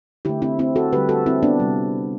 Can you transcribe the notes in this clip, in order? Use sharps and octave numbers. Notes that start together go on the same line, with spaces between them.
D3 A3 E4 G4
C4 E4
C4 E4
F#4 A4
D3 G3 G4 B4
F#4 A4
C4 E4
B3 D4
C3 G3